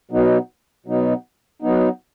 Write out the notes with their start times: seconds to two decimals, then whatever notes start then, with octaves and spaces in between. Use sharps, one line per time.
0.11 B2 F#3 B3 D#4
0.86 B2 F#3 B3 D#4
1.62 F#3 B3 D#4